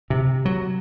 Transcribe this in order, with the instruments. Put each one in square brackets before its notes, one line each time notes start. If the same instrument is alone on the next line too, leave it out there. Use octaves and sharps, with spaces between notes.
[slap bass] C3
F#3